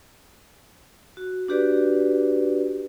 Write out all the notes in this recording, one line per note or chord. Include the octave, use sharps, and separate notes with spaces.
F#4
D4 F#4 G4 B4 D5